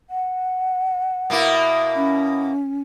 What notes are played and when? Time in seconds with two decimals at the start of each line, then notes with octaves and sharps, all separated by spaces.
0.10 F#5
1.30 B2 A#3 E4
1.96 C#4